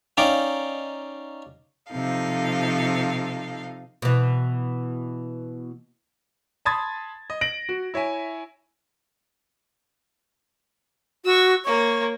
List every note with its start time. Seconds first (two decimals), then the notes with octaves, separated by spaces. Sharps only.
0.17 C#4 D#4 D5 F5 G5
1.92 C3 F3 D#4 A4 F5
4.02 B2 E3
6.65 A5 B5 C6 D#6 G#6 A6
7.30 D#5
7.41 A#6 D7 F#7
7.69 F#4
7.94 E4 C#5 E5 G#5
11.25 F#4 C#6 E6
11.65 A#3 C#5 C#6